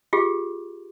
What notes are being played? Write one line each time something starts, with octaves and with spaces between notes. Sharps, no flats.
F4 G4 G#4